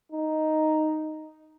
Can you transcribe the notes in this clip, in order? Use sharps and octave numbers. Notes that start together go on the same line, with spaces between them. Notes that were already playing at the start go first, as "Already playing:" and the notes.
D#4